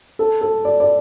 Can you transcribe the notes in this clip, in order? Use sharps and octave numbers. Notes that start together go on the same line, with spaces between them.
A4
A4
D5
D5